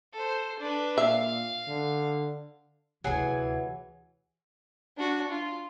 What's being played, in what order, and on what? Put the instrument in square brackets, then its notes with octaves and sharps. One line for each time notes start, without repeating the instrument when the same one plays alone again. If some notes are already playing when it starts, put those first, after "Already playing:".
[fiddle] A4 C5
D4 B4
[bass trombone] A#2 [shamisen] E5 [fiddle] F5
[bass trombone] D3
[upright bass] D2 C3 [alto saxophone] E3 [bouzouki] F#3 G#5 [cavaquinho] G#4 F#5
[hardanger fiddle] D4 F#4
F4